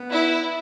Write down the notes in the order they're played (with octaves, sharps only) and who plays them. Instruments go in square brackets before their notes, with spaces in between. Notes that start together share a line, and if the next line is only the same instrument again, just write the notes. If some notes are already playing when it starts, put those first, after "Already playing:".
Already playing: [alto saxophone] B3
[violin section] E4